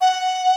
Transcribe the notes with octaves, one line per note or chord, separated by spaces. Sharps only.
F#5